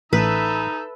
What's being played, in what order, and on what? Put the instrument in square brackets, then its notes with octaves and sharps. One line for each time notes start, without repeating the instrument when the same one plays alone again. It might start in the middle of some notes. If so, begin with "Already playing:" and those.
[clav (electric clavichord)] A1 [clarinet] D#4 [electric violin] A4 E5 [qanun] B4